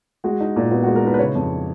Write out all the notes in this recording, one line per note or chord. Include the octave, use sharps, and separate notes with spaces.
G#3 F#4
D#4
A#2
B3 F#4
G#3 F#4
A#4
D#4 B4
B4
C#3 C#5
F2